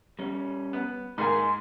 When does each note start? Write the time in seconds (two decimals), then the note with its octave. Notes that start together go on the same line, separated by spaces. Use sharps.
0.19 G3 C#4
0.73 B3
1.18 G#2 A#3 D#4 G#4 G#5 C6